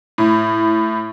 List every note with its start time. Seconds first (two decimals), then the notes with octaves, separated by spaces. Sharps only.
0.18 A2